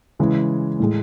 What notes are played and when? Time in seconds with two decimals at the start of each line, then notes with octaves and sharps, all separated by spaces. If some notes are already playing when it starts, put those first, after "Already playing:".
0.19 C#3 E3 G#3
0.79 A2 G#3